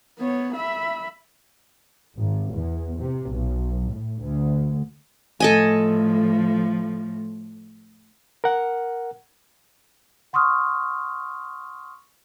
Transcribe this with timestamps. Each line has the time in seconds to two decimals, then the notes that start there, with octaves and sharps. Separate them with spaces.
0.18 B3 C#5
0.55 E5 B5
2.16 G#1
2.52 E2
2.98 C3
3.29 B1
3.91 A2
4.20 D2
5.40 A2 F3 A4 D#5 G#5
8.44 A#4 F#5
10.33 F#5 C6 C#6 D#6 F6